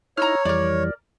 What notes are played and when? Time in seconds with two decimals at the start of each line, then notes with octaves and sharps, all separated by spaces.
0.17 D#4 E4 C#5 A#5 E6 F6
0.45 F2 E3 G3 A#4 D5